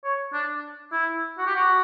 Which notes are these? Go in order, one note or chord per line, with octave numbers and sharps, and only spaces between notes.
C#5
D4
E4
F#4
G4
F#4